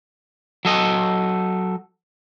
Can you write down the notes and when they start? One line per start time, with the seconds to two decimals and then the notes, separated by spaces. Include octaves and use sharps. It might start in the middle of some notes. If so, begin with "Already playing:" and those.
0.65 F#3 A4 D#5